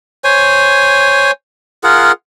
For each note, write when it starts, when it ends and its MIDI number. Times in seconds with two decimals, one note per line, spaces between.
0.24 1.31 72
0.24 1.31 73
0.24 1.31 80
1.84 2.12 65
1.84 2.12 68
1.84 2.12 70
1.84 2.12 78